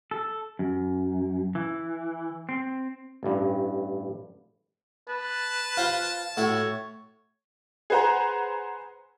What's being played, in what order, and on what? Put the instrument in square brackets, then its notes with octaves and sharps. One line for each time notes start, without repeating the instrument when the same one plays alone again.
[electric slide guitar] A4
F#2
E3
C4
[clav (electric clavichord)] A1 G2
[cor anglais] B4 [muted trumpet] A5
[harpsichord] F4 C5
[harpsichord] A2 F#4 [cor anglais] C#5
[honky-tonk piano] G#4 B4 C5 F#5 A#5